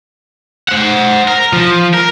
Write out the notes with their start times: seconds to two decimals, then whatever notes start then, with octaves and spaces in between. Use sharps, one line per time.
0.69 C5 F#5
1.28 A#4
1.53 F3
1.94 A#4